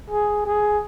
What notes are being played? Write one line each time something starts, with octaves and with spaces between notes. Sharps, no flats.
G#4
G#4